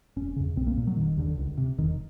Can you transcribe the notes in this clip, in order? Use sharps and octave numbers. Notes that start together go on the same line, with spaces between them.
F1 C#4
F2 C#3
B1 C4
A#3
A#2
F#3
F1 D#3
D#2 D3
C#2
C3
E1 D#3